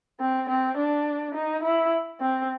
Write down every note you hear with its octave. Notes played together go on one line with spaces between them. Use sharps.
C4
C4
D4
D#4
E4
C4